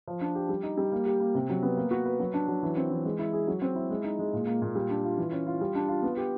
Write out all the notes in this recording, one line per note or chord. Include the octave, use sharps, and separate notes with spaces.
F3
D4
G4
G3
D#4
G3
A#3
G4
A#3
C3
F#3
B3
A#3
F#4
B4
F#3
D4
F#3
E3
C4
E3
G#3
E4
G#4
F#3
C4
E4
G#3
D#4
G#3
A#2
A#3
A#2
G3
D4
F4
E3
C#4
F4
G3
D4
F4
B3
G4